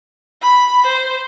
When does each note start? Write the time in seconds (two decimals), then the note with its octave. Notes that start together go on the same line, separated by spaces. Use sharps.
0.42 B5
0.86 C5